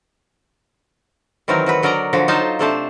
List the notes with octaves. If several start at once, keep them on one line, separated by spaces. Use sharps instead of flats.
D#3 E3 F#3 C4 A#4
F#3 F#4 B4
D3 F#3 A#4 D5 D#5 A#5
D3 F3 F#4
F#3 D#4 F4 C5 F5 A5
C3 A3 D4 A4 C5 A5